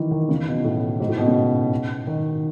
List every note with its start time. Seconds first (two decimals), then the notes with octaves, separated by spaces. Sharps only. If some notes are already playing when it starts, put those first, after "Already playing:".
Already playing: D#3 E3
0.11 D#3
0.29 C#3
0.47 B2
0.64 A2
1.00 G#2
1.09 A2
1.18 B2
1.26 C#3
2.07 D#3